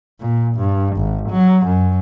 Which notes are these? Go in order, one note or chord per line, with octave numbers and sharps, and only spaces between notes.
A#2
G2
G#1
F#3
F#2